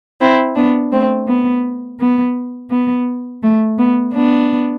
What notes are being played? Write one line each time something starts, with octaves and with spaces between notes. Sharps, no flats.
C4 E4
B3 D4
A3 C4
B3
B3
B3
A3
B3
B3 D4